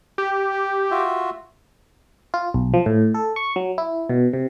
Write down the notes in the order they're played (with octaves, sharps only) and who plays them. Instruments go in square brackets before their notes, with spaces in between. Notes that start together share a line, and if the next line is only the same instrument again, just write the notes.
[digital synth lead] G4
[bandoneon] F4 F#4 E5
[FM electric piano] F4
B1
F3
A2
A4
C#6
F#3
E4
B2
C3